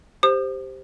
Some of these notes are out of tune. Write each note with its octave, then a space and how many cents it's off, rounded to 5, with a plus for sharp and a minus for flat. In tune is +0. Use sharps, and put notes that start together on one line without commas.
G4 +0 C5 +0 D#6 -45